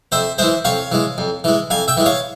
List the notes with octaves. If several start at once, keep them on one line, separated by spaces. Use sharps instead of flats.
F2 C5 E5
E3 G#3 C5 E5
F2 C#5 F5
E3 G#3
F2
E3 G#3
F2 F5 G#5
E5 G5
E3 G#3
C#5 F5